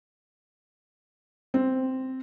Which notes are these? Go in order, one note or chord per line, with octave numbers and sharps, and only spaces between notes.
C4